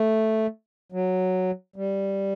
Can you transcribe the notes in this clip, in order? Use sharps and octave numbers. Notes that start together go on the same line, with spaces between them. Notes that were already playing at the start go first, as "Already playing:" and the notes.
Already playing: A3
F#3
G3